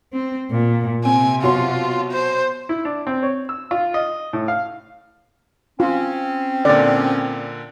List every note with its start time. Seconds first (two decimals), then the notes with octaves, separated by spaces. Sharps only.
0.13 C4
0.51 A#2
1.05 C3 C4 G#5
1.43 B2 F#3 F4 C6
2.11 C5
2.69 E4
2.85 D4
3.07 C4
3.23 C#5
3.49 E6
3.71 F4
3.94 D#5
4.33 A2
4.48 F5
5.80 C4 C#4 F4
6.65 A#2 D3 D5